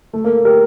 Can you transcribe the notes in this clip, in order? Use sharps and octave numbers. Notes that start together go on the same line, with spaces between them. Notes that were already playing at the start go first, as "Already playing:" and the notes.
A3
A#3
G4 A#4